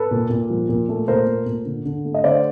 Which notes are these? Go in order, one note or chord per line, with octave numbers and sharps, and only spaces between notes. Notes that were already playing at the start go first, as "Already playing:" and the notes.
Already playing: A4 B4
A#2
A#2
F3
A#2
A3
A#2 A#4 C5
A3
A#2
D3
D3
A3
D#5
D3 C5 D5